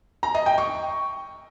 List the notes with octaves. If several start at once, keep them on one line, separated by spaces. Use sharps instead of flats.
A#5
D#5
G5
C#6